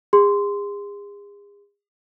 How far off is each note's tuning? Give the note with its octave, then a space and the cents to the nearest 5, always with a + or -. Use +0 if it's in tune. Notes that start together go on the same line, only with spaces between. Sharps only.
G#4 -40 C6 -15